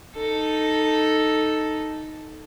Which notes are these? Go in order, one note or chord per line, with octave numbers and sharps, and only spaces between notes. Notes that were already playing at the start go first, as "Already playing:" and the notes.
D#4 A4